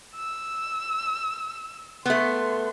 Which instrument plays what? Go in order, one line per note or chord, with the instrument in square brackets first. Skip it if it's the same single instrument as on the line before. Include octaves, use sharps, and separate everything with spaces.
[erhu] E6
[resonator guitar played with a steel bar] A3 B3 [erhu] C6